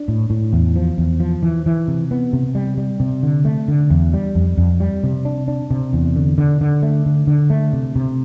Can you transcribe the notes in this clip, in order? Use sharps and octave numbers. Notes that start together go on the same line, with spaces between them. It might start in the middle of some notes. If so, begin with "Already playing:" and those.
Already playing: D4
A2
A2
E2
F3
E2
F3
E3
E3
C3
B3
C3
G3
G3
C3
D3
A3
D3
E2
G3
F2
F2
G3
C3
D4
D4
C3
E2
D3
D3
D3
A3
D3
D3
A3
C3
C3